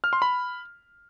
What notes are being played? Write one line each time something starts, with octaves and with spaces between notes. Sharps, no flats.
F6
C6
B5